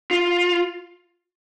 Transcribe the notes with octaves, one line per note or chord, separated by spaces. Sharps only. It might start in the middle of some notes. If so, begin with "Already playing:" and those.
F4